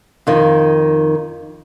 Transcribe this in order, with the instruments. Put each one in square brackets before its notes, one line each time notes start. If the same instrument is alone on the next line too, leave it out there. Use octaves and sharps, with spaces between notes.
[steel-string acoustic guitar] F2 D#3